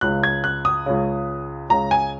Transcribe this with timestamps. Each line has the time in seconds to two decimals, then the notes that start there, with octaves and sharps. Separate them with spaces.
0.01 C#2 C#3 F#6
0.23 G#6
0.44 F#6
0.65 D#6
0.86 C#2 C#3
1.69 C#2 C#3 A#5
1.91 G#5